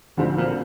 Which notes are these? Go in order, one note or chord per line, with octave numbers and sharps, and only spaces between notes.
D2 G#2 D3 F3 C4
A#2